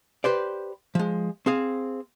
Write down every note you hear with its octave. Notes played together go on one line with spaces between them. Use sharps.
G4 B4 C5 D5
F3 G#3
C4 G#4 F5